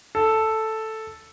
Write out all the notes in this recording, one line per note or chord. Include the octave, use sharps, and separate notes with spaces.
A4